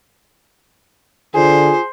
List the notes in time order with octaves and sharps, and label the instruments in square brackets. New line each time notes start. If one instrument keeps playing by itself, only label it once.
[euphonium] D3 [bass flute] F4 [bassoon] G#4 [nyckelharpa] C5